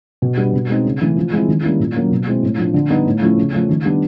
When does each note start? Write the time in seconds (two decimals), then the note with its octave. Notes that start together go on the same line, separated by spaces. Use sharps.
0.22 B2
0.37 G3 B3 D4
0.53 B2
0.69 G#3 C4 D#4
0.84 C#3
1.01 E3 A3
1.17 F3
1.32 G#3 C4 E4
1.48 D#3
1.63 G3 A#3 C#4 E4
1.80 A#2
1.95 F#3 A#3 C#4
2.11 B2
2.27 G#3 C4 E4
2.43 A2
2.58 F3 A3 D4
2.74 D3
2.90 G3 B3 D#4
3.05 A2
3.22 F3 A3 C#4 E4
3.38 C#3
3.53 F3 A3 C#4
3.69 D#3
3.85 G3 B3 D4